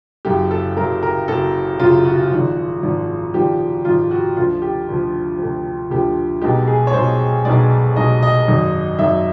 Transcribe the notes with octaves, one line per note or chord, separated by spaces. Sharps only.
F#1 F#2 C#3 F#3 G4
A4
F#1 F#2 C#3 F#3 A#4
A#4
F#1 F#2 C#3 F#3 A4
F#1 F#2 C#3 F#3 F4
F#4
G#1 G#2 F3
G#1 G#2 F3
G#1 G#2 F3 G4
G#1 G#2 F3 F4
F#4
D2 D3 F3 F4
G4
D2 D3 F3
D2 D3 F3
D2 D3 F3 G4
B1 B2 G#3 G4
G#4
C#5
B1 B2 G#3 C5
B1 B2 G#3 D5
B1 B2 G#3 D#5
D#5
G#1 F#2 D#3 F#3
G#1 F#2 D#3 F#3 E5